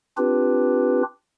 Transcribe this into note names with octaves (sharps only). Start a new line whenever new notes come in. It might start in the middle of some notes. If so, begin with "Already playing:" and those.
C4 D4 F4 G4 B4